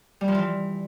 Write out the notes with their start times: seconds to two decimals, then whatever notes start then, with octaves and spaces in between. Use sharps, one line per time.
0.21 G3
0.28 F3
0.35 E3